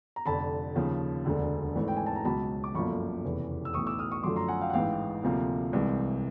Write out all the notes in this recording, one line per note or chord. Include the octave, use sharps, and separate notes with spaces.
A#5
F1 F2 D3 A5 B5
D#2 C#3 F3
E1 D2 D3
G#1 G#2 E3 A3
G5
G#5
A5
A#5
C#2 B2 F#3 A5 B5
D6
G1 F#2 D3 F3 A#3 B5 C#6
F1 E2 C#3 E3
E6
B1 A2 E3 C#6 D#6
D6 E6
D#6 F6
C#6 D#6
F#2 D3 F3 A3 C6 D6
A#5 C6
F#5 G#5
F5 G5
F#5
A1 G#2 E3 F5 G5
D2 C3 F3 A#3
C2 C3 E3 G#3